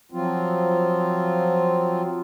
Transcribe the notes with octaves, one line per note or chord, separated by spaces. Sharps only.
F3 F#3 C4 F4